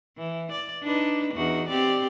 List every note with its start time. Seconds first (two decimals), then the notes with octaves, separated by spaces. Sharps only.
0.17 E3
0.52 D5
0.84 D4 D#4 B4
1.34 E2 D#4 F#4
1.69 C4 G4 D5